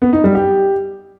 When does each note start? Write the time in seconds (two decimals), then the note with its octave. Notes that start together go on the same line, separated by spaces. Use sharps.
0.02 B3
0.13 D#4
0.24 G3
0.35 G4